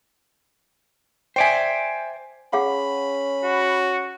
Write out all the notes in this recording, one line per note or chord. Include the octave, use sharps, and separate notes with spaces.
C5 D5 E5 G5 G#5
C#4 G#4 F5 F#5 B5
F#4